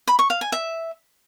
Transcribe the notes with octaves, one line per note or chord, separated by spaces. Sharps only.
B5
C#6
F5
G#5
E5